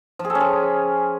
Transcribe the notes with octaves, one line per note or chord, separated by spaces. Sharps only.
F3
G#4
A4
C#4
G#4